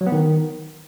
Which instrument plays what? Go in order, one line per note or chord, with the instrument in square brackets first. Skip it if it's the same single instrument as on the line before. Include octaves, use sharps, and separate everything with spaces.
[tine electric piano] F#3
B3
D#3